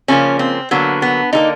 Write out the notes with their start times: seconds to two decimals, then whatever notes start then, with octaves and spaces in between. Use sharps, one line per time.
0.08 C#3 F3 A#3 C#4
0.39 C4
0.71 D3 F#3 A#3 B3
1.02 B3
1.33 D3 G3 A#3 D#4